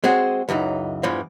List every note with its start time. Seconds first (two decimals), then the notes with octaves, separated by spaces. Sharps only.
0.04 G#3 C4 F#4 G#4
0.49 C#2 F#2 E3 D#4
1.03 E2 G2 E3 F3